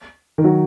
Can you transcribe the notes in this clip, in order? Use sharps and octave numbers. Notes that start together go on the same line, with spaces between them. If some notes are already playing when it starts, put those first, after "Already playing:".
D#3
F#3